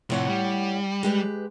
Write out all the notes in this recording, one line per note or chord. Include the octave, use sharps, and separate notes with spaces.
A2 C3 F3 C#5 F#5
G3
G#3 G4 B4